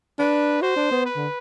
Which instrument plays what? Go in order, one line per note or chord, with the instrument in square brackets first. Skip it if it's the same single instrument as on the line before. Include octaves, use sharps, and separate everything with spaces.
[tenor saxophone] D4 [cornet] B4
[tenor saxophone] F#4 [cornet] C5
[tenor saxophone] D4
B3
[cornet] B4
[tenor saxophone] D3